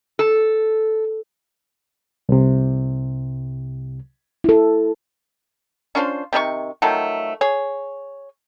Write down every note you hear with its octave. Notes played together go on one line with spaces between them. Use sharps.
A4
C2 C3
E4 A4
C#4 D4 F4 C5
C3 D#3 E4 C#6
D#3 F3 F#3 A3
G#4 C#5